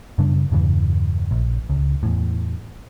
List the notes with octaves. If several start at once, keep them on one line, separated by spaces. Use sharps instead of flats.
F#2 C#3 G3 D4
E2 G2 C#3 E3
A#1
C#2
E2 A2